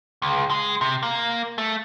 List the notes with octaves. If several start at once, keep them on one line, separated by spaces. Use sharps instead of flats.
C#2
G#3
C3
A#3
A3